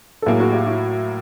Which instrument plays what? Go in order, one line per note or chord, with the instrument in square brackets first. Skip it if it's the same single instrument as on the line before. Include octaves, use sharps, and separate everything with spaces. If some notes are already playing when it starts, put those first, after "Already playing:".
[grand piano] A4
[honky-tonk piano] A2 F#3 A#3 [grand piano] G#4 A#4
[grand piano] F#4 G#4
F4 G4
E4 F#4